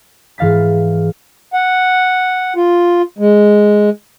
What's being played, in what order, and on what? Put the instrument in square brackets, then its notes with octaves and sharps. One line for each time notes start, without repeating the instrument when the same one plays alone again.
[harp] G#2 E3 F5 A6 B6
[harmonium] F#5
F4
G#3